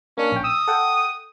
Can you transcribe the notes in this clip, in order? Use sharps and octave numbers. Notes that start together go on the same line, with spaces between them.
A#3 C#4 D4
A#1 G5
D#6 E6
A4 F#5 G5